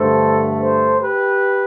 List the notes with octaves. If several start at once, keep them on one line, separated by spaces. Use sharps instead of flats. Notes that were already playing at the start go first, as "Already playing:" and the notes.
Already playing: G2 D3 A3 A4 C5
A4 C5
G4 B4